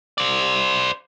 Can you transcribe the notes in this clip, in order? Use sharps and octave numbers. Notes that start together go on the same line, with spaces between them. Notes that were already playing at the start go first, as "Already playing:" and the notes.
C5 D5